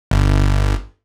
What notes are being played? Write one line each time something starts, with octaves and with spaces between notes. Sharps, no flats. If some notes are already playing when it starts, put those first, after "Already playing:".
G1